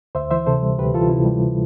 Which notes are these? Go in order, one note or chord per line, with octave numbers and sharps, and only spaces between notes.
D2 C5 E5
E3 C5 E5
C3 A4 C5
G3
D2 G4 B4
E3 F4 A4
C3 E4
G3